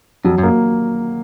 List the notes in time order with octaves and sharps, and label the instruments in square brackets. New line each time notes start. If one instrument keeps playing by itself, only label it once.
[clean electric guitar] F2 [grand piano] F#3
[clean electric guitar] F#2
[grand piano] A#3